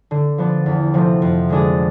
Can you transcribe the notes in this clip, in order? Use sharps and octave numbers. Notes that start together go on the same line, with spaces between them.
D3
F3 B3 D4
E2
C3 F3 A3 C4
F2
D3 G#3 D4 G#4